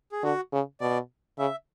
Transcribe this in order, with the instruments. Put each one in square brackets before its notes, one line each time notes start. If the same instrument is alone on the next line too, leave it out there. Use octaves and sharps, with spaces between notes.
[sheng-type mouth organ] G#4
[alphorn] D3 [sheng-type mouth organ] F#4
[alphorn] C#3
[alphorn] B2 [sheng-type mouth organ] D5
[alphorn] C#3 [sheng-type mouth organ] E5